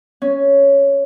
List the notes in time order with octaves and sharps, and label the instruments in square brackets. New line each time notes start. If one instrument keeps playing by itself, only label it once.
[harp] C#4